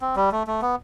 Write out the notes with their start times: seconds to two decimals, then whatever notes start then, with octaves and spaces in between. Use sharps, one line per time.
0.02 C4
0.16 G3
0.32 A3
0.47 A3
0.62 B3